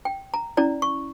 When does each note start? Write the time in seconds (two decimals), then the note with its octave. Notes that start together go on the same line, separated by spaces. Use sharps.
0.05 G5
0.34 A#5
0.57 C#4 E4 D5 A#5
0.82 C#6